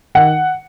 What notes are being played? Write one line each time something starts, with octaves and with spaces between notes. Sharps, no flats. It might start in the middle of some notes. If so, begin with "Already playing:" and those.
D#3 F#5